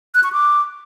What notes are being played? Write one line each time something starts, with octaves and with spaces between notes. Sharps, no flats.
F#6
C#6
D6